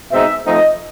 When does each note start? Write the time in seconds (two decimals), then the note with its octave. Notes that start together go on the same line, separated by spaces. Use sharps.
0.12 B2 G#3 C4 D#4 E5
0.45 F3 A3 C4 D#4 D#5